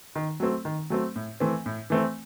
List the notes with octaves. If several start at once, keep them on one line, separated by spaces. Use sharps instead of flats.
D#3
F#3 A3 C4
D#3
F#3 A3 C4
A2
E3 A3 C4
A2
E3 A3 C4